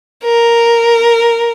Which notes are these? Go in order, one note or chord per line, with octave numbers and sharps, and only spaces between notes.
A#4